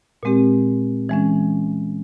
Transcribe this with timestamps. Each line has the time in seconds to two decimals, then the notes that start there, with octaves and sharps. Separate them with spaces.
0.23 A#2 G#3 C4 G4
1.09 E3 G#3 C#4